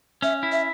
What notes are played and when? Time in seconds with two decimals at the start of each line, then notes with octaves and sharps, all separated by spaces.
0.22 C#4 E5
0.43 E4
0.52 E5